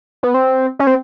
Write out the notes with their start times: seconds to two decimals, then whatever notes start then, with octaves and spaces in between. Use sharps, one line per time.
0.23 B3
0.34 C4
0.79 C#4
0.87 C4